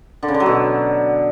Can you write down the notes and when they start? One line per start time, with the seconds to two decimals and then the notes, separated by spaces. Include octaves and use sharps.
0.23 D3
0.28 C#3
0.34 D3
0.40 F#3
0.46 B2